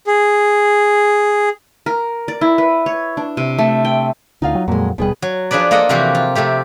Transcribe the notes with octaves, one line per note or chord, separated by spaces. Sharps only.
G#4
A#4
D5
E4
B4
C#5
D4
C3
A3
G5
D2 D3 D#4 F4 F5
F#3
F2 A#2 F#3 G#3
D#1 B2 G3 G#4 B4
F#3
F3 D4 G#4 B4 D5
A#3 F4 A4 D#5 F#5
C3 E3 F3 A#3 F#4 G4
F4
C3 F3 A3 G4